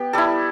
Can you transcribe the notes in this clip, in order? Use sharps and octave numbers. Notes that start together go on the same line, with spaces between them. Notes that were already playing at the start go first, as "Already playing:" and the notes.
Already playing: B3 G4
G3 E4 A4